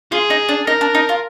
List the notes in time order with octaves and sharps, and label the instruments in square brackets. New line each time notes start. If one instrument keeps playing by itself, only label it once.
[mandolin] F4 [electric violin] G#4
[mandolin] D#4
D4
[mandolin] D#4 [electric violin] A#4
[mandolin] D4
D#4
F4